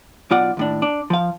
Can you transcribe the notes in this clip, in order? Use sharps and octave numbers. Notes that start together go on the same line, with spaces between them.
B1 B2 F4 D5 F#5
D#2 A2 D4
D4
F3 F5